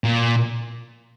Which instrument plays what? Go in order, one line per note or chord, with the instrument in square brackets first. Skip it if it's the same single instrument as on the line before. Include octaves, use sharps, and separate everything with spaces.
[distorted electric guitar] A#2